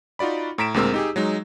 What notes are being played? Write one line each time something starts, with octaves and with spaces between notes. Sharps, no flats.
D#4 F4 F#4 D5 B5
A2 A#5 B6 D7 E7
D2 A#2 G#3 C4 A#4 E6
D#4 G4 G#4
F#3 G#3 D#4